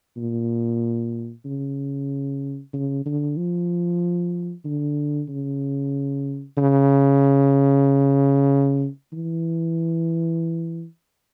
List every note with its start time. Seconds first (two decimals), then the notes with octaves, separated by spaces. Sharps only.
0.17 A#2
1.45 C#3
2.74 C#3
3.06 D3
3.37 F3
4.65 D3
5.29 C#3
6.57 C#3
9.13 E3